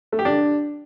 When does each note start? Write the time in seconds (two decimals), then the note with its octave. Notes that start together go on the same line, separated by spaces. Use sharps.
0.12 A3
0.19 G4
0.25 D4